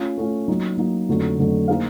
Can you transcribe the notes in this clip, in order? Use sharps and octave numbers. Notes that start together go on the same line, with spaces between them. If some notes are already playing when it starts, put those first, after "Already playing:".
Already playing: A3 C#4 F4
A3 C#4 F4
F#3 A#3 D#4
F#3 A#3 D#4
F2 D3 F#3 A3
F2 D3 F#3 A3
A#3 D#4 G#4 C5 F5